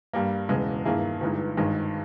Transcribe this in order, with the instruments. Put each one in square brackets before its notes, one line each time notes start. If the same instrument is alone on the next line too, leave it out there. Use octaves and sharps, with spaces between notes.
[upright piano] G2 G3 A#3
E1 E2 C#3 G#3
G2 D#3 A#3 E4 G#4
G1 G2 E3 G#3 D#4
G#1 G2 D#3 G#3